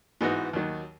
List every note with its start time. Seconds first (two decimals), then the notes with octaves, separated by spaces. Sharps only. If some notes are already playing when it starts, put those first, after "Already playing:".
0.21 G#2 E3 B3 D#4 F#4
0.53 D#2 D#3 F#3